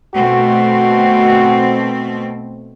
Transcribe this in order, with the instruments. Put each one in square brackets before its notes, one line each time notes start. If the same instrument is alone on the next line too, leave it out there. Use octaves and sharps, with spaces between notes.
[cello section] B2 A3 C4 [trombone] F#4